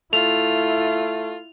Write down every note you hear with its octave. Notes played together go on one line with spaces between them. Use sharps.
A3 E4 F4 F7